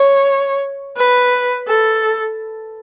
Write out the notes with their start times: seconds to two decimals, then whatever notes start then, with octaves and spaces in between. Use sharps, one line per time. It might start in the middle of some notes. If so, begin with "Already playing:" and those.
Already playing: C#5
0.97 B4
1.68 A4